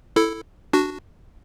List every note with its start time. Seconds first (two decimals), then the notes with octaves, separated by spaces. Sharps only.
0.16 E4 A4
0.73 D4 F#4